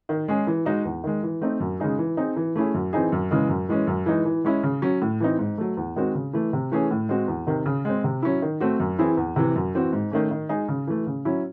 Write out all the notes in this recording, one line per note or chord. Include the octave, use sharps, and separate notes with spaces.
D#3
G#3 C#4 G#4
E3
G#3 D#4 F#4
E2
D#3 G#3
E3
A3 C4 D#4
F#2
C#3 G#3 D#4 G#4
E3
C4 D#4 G#4
E3
A3 C#4 E4 G#4
F#2
E3 C4 D#4 G#4
F#2
C#3 E3 G#3
F#2
E3 G#3 C#4
F#2
E3 G#3 D#4
E3
G#3 C#4 E4
C#3
F#3 C#4
A2
E3 C4 D#4
G#2
F#3 A3
E2
D#3 G#3 C4 F#4
C#3
E3 A3
C3
E3 A3 C#4 G#4
A2
G#3 C4 F#4
E2
C3 D#3
C#3
G#3 C4
C3
F#3 C#4 E4
D#3
A3 C4 F#4
F#2
E3 C4 E4 G#4
E2
C3 E3
F#2
E3 C4 F#4
G#2
D#3 A3 C#4
D#3
G#3 D#4 G#4
C#3
E3 A3
C#3
F#3 C#4 E4